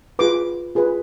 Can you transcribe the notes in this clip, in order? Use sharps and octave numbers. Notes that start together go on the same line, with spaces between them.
F4 G#4 B4 D6
F4 G#4 B4